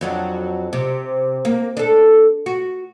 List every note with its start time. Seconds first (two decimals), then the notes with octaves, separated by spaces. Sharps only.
0.01 F2 F#3 D4
0.73 C3
1.45 A#3
1.77 D4 A4
2.46 F#4